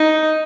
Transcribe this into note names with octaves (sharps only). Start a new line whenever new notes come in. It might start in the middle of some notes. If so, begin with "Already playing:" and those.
Already playing: D#4